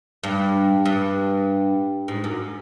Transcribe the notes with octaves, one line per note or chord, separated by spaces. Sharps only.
G2
G2
G#2
F#2